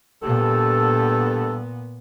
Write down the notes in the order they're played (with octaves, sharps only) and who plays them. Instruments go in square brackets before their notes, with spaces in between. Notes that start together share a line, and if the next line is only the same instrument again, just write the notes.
[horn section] G2 A4 [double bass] A#2 B3